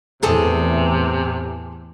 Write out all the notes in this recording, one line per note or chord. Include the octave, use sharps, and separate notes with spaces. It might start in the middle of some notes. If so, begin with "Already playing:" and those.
E2 A2 C3 E3 G#4 A4 D#6